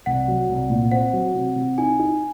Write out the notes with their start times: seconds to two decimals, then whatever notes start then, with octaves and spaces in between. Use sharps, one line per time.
0.06 C2 F#5
0.28 F#3
0.49 C2
0.70 A#2
0.91 C4 F#5
1.13 F#3
1.34 C3
1.56 C3
1.78 D#4 G#5
1.99 D#4